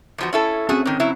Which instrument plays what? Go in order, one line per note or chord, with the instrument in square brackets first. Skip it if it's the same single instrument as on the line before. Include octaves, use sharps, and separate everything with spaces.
[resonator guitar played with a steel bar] E2 F3 F#4
C#4 E4 A4
[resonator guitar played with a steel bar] A3 F#4 G#4 [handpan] C4 C#4
[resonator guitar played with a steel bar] G#2 D#3
C#3 F#3 E4